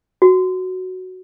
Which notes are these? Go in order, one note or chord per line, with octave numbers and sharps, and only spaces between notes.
F#4